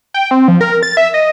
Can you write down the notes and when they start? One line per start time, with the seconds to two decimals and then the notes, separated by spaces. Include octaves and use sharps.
0.14 G5
0.31 C4
0.48 F3
0.61 A#4
0.83 A6
0.97 E5
1.14 D#5